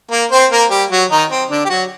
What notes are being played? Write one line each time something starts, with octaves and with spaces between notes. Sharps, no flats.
A#3 A#4
C4 C5
A#3 A#4
G3 G4
F#3 F#4
D#3 D#4
C4
D3 D4
G4
F#3 F#4